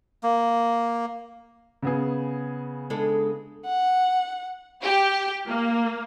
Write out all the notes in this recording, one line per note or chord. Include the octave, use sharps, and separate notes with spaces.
A#3
C#3 B3 G#4
G#3 D4 A4
F#5
G4
A#3